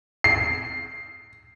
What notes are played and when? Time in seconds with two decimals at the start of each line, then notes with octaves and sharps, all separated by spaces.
0.24 C7